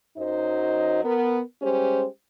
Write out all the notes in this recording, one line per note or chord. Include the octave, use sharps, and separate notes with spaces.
F#2 F#3 D#4 C5 D#5
B3 A#4
G3 G#3 C#4 G4 C5